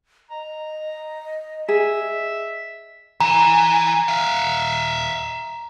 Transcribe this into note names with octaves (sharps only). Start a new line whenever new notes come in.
D#5 A#5
G#4 E5
E3 A#5
E5 F5